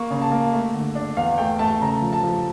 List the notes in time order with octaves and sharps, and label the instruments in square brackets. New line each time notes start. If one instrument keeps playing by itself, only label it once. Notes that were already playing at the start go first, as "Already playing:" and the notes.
Already playing: [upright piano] A#3 C#6
C#3
A5
A#3
A3
D3
D4
E2 F5
A3 G5
A3 A5
C#3 A#5
F3
A5
F3